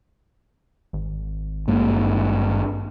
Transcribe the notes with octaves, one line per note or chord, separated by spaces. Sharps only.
G#1
G2 G#3 A#3